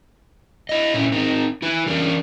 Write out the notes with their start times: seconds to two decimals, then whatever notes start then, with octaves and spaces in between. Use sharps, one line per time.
0.69 E4 D#5
0.94 A#2 C#4 E4
1.12 C4 D#4 A#4
1.62 E4 B4
1.86 E3 C#4 D4 G4 A#4